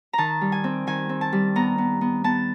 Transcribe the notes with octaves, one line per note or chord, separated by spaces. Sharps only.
D#3 A5 A#5
G3
G#5
C4
D#3 G#5
C4
A5
G3
B3 A#5
B3
B3
B3 A5